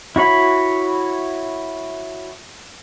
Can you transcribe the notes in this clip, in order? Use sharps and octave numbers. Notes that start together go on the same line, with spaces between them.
E4 F#4 C#5 B5